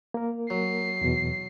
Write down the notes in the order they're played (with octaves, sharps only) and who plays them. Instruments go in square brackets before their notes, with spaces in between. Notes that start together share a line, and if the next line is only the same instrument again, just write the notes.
[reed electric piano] A#3 A#4
[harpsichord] F#3 [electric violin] C7
[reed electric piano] E2 B2